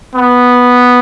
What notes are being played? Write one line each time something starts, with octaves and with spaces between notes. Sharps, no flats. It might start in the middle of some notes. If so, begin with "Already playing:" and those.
B3